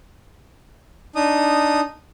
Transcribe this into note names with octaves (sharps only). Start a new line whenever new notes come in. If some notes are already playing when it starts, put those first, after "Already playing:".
D4 D#4 D#6